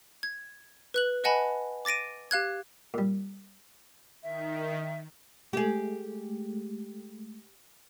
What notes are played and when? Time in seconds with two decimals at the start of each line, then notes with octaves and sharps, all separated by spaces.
0.23 G#6
0.94 B4 F#6 F#7
1.24 B4 D#5 F#5 G#5 A5 B5
1.85 D6 A6 A#6 D7 D#7
2.31 G4 F5 F#6 G#6
2.94 A#2 G3
4.23 D#3 E5
5.53 G#3 A3 G4 G#4